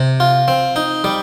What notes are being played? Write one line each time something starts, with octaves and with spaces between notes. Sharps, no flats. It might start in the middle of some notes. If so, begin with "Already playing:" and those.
Already playing: C3
F4
C4
D#4
G3